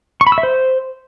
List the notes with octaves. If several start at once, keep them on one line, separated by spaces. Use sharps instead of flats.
C#6
B5
E6
E5
C5